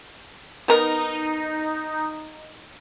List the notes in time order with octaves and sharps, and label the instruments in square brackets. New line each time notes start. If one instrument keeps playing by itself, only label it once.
[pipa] B3 A#4 [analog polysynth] D#4